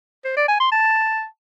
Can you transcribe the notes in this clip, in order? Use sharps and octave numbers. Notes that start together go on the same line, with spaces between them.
C5
D5
G#5
C6
A5